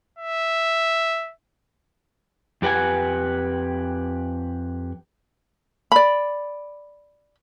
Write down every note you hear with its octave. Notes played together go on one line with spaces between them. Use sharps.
E5
F2 G4 B4 F#5 G#5
D5 B5